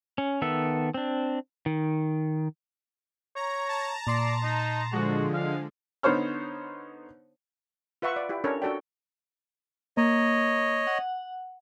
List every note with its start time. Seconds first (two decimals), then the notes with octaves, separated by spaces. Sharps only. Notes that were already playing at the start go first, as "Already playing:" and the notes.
0.18 C#4
0.42 D#3 B3 A4 E5
0.94 C4 D4
1.66 D#3
3.36 C#5 A#5
3.68 A5 A#5
4.07 A#2 D5 C6 C7
4.43 D#4
4.92 D3 F3 G#3 F#4
5.33 F5
6.03 D3 B3 D#4 C5 C#5 F6
8.02 F4 B4 E5 F#5 C#6
8.16 D5
8.29 E4 G4
8.44 C#4 D4 A4 A#4 C#5
8.62 D4 F#4 A4 D5 G5
9.97 A#3 C#5 D#5
10.87 F#5